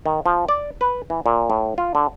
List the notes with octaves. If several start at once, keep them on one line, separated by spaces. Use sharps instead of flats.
D#3
F3
D5
B4
E3
A#2
A2
F4
D3